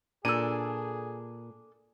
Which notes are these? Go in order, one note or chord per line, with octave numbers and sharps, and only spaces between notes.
A#2 D4 G#4 A4 E6 D#7